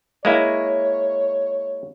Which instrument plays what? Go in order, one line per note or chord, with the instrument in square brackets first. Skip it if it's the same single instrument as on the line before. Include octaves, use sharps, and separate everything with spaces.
[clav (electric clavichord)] G#3 A#3 E4 [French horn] C#5